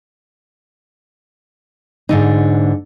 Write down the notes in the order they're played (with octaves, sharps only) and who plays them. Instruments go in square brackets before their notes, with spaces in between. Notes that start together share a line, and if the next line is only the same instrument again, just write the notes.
[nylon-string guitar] G#2 D3 D#4